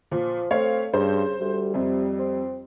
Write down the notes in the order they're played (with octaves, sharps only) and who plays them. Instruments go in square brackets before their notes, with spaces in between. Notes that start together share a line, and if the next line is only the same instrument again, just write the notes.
[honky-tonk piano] A#2 [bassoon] F3
[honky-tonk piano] A3 C#5 F5 [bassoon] C4
[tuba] G2 [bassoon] C#3 [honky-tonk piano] C5
[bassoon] D2 [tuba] G3
[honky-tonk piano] F2 [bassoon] C3
[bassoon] C4